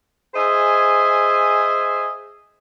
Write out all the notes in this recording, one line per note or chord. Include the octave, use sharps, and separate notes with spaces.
G#4 C5 D#5 E5 G#5